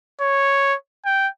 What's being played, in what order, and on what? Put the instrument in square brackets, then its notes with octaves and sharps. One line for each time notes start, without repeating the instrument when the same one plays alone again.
[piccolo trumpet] C#5
G5